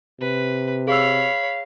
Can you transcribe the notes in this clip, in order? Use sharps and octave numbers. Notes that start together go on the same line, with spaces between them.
C3 B4
G#4 C#5 F5 B5 E6